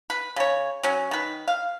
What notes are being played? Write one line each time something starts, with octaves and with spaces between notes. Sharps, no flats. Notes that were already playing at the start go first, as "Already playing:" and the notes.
B4
C#3 C#5
F#3 C#4
D#3 B4
F5